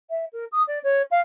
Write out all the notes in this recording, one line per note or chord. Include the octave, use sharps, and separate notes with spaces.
E5
A#4
D#6
D5
C#5
F5